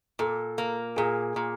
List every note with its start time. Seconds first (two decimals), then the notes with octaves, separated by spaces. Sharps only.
0.19 A#2 A4
0.58 A#3
0.97 A#2 G#4
1.36 A#2